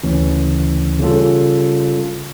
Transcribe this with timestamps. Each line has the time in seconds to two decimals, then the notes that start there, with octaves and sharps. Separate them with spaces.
0.03 D2 C#3 E3 A3 C#4
0.99 C#3 G3 C#4 F4 A4